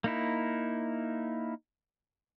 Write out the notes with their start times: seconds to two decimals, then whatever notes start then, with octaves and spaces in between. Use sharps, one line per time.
0.04 A#3 D#4 E4